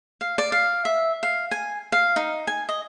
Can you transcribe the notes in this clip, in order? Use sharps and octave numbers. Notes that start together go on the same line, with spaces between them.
F5
D5
F5
E5
F5
G#5
F5
D#4
G#5
D#5